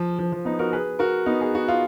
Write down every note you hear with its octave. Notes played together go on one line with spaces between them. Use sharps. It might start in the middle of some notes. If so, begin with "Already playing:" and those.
Already playing: F3
F3
F3
B3 D#4
F#4 A#4
G#4 B4
F#4 A#4
B3 D#4
G#4
F#4
F4